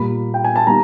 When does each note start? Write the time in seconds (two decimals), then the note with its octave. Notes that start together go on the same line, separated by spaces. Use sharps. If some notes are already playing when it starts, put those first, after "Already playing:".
Already playing: A#2 G3 A#3 B5
0.34 G5
0.44 G#5
0.56 A5
0.67 D#3 G3 A#3 A#5